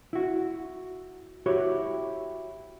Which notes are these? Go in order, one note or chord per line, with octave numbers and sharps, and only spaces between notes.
E4 F#4
E4 F#4 G4 C#5